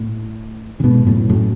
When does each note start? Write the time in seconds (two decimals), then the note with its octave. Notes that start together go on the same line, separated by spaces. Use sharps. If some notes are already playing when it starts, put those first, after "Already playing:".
Already playing: A2
0.80 C#3
0.84 G#2 B2
1.06 F#2 A2
1.29 F#2 A2